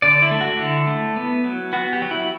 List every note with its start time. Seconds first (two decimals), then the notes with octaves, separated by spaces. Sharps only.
0.02 D3 D5
0.22 E4
0.31 A3
0.41 F#4
0.59 D3 E4
0.87 A3
1.16 B3
1.44 F#3
1.73 B3 F#4
1.93 G4
2.02 F#3
2.11 E4